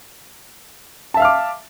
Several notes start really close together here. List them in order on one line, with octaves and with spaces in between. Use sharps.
A5 E5 F5 F6 D6